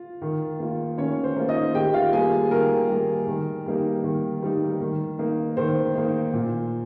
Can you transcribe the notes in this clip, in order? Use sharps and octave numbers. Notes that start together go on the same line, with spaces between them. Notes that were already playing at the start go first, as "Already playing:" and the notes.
Already playing: F4
D#3
A#3 F4
D#3 C#4 C#5
C5
A#3 F4
D#4 D#5
D#3 G4 G5
F4 F5
G3 A#3 G#4 G#5
D#3 A#4
G3 A#3
D#3
G3 A#3 D#4
D#3
G3 A#3 D#4
D#3
A#3 D#4
D#3 C5
A#3 D#4
A#2